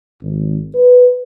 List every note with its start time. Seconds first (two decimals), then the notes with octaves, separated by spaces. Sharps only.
0.21 G#1
0.75 B4